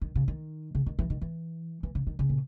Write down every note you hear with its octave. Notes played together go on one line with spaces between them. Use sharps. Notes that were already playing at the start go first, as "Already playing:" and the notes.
D#3
C#3
D#3
C#3
D#3
E3
D#3
E3
E3
C#3
D#3
C#3
A#2